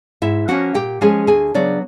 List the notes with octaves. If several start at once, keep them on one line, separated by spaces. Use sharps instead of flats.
G#2 E4 E5
F3 A#3 C#4 F#4 F#5
A#2 G4 G5
F3 G#3 C#4 G#4 G#5
D2 G#4 G#5
C#3 F#3 B3 D4 D5